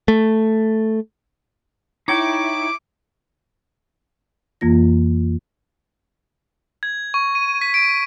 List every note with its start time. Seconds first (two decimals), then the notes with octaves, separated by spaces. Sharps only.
0.08 A3
2.08 D#4 E4 C#5 G5 D6 C#7
4.61 F2 E3 A#3 F4 A#6
6.83 G#6
7.14 C#6
7.35 D#7
7.61 B6
7.74 D7